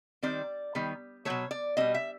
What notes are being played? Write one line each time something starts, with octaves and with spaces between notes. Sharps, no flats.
D#3 G3 C4 D5
D#3 G3 B3
B2 F#3 A3 C#5
D5
B2 G3 C4 D#5
E5